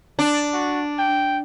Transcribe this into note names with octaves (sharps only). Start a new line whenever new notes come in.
D4
F#4
G5